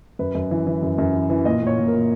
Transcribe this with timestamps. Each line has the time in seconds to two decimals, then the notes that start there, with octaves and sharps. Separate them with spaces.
0.19 F#2 B4
0.35 F#2
0.51 E3
0.67 E3
0.82 F#2
0.98 F#2
1.14 E3
1.30 E3
1.45 A#2 D#5
1.62 A#2 C#5
1.78 A#2
1.88 A#4
1.93 A#2